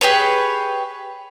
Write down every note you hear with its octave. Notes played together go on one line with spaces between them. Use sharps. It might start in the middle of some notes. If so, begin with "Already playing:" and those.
G4 G#4 B4 C#5